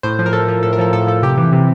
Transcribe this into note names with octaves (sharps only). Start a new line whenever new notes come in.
A2 C5
F3
A#4
A2 A4
F3
A2 A4
A#4
F3 A4
A2 A4
F3 A4
C3 G4
E3
C3